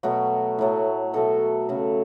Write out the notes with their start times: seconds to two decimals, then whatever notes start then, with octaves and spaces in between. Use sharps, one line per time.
0.03 B2 F#3 A3 F#4
0.59 A2 F#3 A3
1.13 B2 F#3 A3 A4
1.69 C#3 F#3 A3